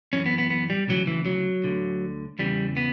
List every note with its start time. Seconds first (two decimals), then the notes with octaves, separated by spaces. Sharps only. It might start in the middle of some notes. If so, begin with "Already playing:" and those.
0.13 F#2 E3 C#4
0.26 B3
0.38 B3
0.50 B3
0.70 G3
0.87 D2 C#3 E3 F#3
1.07 E3
1.26 F#3
1.64 D2 D3
2.39 E2 C#3 E3 G3
2.77 B3